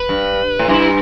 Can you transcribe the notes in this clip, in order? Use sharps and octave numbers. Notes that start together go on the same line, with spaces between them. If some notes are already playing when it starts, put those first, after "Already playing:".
Already playing: B4
G2
A2
G2 E4